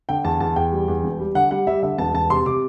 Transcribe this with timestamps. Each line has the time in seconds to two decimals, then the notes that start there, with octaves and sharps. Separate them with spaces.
0.09 D3 G5
0.24 E2 A5
0.40 E2 A5
0.56 E2 G5
0.72 G3
0.88 E2
1.04 E1
1.19 G3
1.35 D3 F#5
1.51 G3 F#5
1.67 G3 E5
1.83 D3 E5
1.98 E1 A5
2.14 E1 A5
2.30 C3 C6
2.46 C3 D6